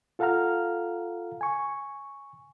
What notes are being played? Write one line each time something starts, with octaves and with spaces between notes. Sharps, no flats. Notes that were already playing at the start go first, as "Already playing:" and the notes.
F4 A4 F5 F#5 A#5 F6
G#5 C#6